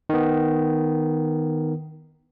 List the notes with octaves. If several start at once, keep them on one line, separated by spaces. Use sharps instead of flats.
D#3 B3